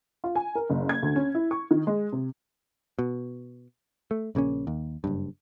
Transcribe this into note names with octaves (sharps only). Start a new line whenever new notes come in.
F4
G#5
A#4
F#1
G#6
D2
C#4
E4
C#6
D#3
G#3
C3
B2
A3
A#1 C#3 A#3 C#4
D#2
F#1 B1 G2